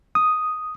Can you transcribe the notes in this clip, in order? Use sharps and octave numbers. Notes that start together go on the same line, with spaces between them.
D#6